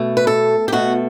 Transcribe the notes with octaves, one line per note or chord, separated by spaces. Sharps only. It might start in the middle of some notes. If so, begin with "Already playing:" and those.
Already playing: B2 A3
B4
A4
G4
B2 A3 F#4